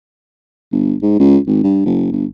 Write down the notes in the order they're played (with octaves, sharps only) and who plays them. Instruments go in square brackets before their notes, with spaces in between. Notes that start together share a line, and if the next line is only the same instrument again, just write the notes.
[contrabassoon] G1
G#2
C#2
G#1
G2
F#1
G1